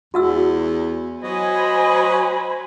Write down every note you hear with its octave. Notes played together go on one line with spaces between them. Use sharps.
E2 F#4 F#5 E6
F#3 C5 D#5 G#5 B5